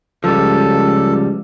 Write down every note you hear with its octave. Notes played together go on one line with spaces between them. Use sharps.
C#2 F3 G3 A4